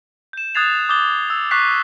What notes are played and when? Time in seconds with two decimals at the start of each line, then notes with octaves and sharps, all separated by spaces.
0.33 G6 E7
0.55 D#6 F#6 G#6 A6 C7 F7
0.89 D6 D#6 G6 A6 G7
1.30 E6
1.51 C#6 D6 F#6 G6 B6 C7